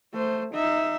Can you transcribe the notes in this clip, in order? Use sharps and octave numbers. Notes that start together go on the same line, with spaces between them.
A3 C5
D#4 E5